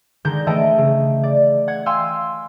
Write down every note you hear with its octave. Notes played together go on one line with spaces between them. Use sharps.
D3 D#3 G#3 G6 A#6
E3 A3 D#5 G5 A5 D7
C#3
D5
F#5 G#6
F5 G5 G#5 C6 E6 F6